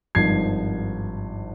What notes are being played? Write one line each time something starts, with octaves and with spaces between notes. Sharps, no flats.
G#1 G2 F3 G#6 C7